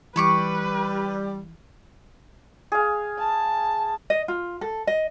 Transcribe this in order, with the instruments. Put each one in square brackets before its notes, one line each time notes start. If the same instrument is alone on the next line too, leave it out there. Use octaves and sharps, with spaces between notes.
[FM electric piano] E3 [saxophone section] G3 [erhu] B4 [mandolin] B5 C#6 D6
[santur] G#4 F5
[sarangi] A5
[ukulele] D#5
F4
A4
D#5